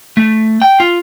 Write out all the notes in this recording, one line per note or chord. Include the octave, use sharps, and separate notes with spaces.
A3
G5
F4